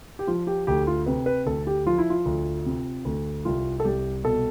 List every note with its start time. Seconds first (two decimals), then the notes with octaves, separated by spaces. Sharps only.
0.19 G4
0.27 F3 F4
0.47 G4
0.67 D2 G4
0.87 F4
1.06 C3 B4
1.26 B4
1.46 D2 A4
1.67 G4
1.86 F3 F4
1.98 E4
2.10 F4
2.25 D2
2.66 C3
3.05 D2
3.45 C2 F4
3.80 A4
3.85 C2 G4
4.24 B2 A4